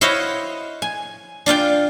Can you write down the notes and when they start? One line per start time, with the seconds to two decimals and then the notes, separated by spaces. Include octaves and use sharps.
0.01 E4 F#4 C5 C#5 D#5 F5
0.82 G#5
1.46 D4 F4 F5 G5